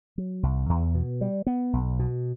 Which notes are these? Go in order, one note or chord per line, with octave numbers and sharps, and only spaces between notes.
F#3
C2
E2
B2
G3
B3
B1
B2